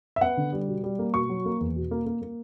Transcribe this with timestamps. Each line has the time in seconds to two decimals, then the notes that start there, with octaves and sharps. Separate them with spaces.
0.16 E5
0.21 B3 F#5
0.37 D3
0.53 G3
0.68 B2
0.84 G3
0.99 A#3
1.14 B2 C#6
1.29 F#3
1.46 A#3
1.61 E2
1.76 B2
1.91 A#3
2.06 A#3
2.22 A#3